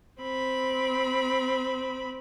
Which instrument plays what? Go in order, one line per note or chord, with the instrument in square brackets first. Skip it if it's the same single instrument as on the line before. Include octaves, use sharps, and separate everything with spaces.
[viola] C4 B5